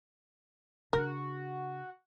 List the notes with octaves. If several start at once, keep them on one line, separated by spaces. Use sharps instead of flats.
C#3 D4 F#4 A#4